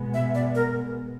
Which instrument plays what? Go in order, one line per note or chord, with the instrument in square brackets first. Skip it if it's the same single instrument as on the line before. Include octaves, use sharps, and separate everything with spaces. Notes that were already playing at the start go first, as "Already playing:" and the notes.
Already playing: [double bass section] B2 G#3 B3
[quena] E5
D5
A#4